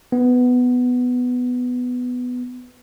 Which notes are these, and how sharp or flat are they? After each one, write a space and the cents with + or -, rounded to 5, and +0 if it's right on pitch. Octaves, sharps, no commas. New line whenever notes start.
B3 +10